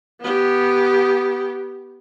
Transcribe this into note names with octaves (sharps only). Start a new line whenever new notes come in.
B3 G4